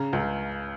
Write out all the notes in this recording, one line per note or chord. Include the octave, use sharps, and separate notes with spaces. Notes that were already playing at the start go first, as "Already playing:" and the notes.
Already playing: C#3 A#5
C#2